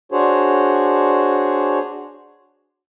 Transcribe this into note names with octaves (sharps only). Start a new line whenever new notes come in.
D4 F#4 G#4 C5 C#5